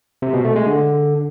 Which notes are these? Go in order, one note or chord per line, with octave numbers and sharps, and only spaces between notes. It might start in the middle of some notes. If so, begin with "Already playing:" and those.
C3
B2
A3
G#3
D3